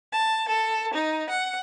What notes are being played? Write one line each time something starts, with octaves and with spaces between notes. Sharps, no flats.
A5
A4
D#4
F#5